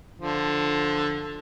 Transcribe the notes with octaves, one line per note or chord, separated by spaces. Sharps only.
D3 F3